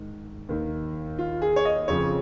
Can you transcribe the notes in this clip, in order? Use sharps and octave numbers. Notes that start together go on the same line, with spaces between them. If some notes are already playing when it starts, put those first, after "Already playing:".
Already playing: G#2 D#3
D#2 D#3
F4
G#4
C#5
D#5
F2 C#3 F3 C#5